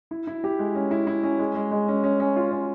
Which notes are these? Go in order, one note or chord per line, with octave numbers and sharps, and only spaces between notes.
E4
E4
G4
G#3
C#4
E4
E4
C#4
G#3
G#3
G#3
C#4
C#4
C#4
F4
C#4